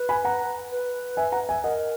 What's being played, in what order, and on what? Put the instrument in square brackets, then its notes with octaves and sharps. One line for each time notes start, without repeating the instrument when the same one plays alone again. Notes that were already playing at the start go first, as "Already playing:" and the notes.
Already playing: [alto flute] B4
[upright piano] G#5 B5
F#5 A#5
[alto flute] B4
[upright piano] E5 G#5
F#5 A#5
E5 G#5
[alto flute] A#4 [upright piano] D#5 F#5